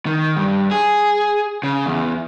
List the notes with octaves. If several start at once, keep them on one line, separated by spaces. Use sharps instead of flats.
D#3
G2
G#4
C#3
E2